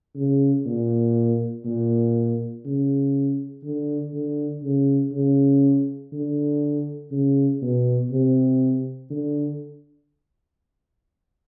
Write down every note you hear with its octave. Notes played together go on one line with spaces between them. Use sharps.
C#3
A#2
A#2
C#3
D3
D3
C#3
C#3
D3
C#3
B2
C3
D3